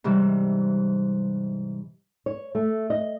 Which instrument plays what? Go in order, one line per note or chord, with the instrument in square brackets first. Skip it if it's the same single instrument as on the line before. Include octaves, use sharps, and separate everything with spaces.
[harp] G#2 C3 E3 G3
[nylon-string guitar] C#5
A3
D#5